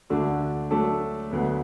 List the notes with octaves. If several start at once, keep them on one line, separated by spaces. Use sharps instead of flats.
D2 D3 A3 D4 F#4
F#3 A3 D4 A4
D2 D3 F#3 B3